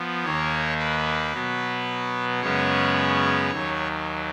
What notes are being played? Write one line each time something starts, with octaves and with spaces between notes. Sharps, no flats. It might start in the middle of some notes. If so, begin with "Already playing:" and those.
Already playing: F3 B3
D#2 D#3 A#3 C#5
B4
B2 F#3 B3
F#2 C#3 G#3 B3 C#5
D#2 D#3 F#3